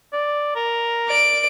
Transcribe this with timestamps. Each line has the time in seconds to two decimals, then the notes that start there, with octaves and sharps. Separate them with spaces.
0.13 D5
0.56 A#4
1.08 D5 D7